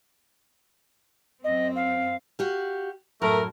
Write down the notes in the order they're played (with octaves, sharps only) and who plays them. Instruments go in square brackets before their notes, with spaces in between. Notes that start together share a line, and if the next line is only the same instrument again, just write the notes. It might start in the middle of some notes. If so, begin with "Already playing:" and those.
[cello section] F#2 C4 [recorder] D#5
[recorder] F5
[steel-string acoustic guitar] F#4 G4 F5
[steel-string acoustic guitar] F#2 A2 F#3 [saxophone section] A3 A#4